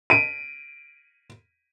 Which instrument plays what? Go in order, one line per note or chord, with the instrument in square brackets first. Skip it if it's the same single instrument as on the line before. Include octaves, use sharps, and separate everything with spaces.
[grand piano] D7 D#7